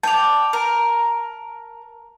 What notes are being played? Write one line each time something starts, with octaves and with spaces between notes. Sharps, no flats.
D5 G5 A5 F7
A#4